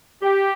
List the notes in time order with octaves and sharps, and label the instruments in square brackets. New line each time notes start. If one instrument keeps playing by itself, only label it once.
[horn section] G4